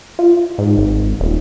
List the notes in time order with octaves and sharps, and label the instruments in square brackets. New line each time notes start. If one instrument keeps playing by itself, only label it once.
[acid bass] F4
G#2
G#1
D#1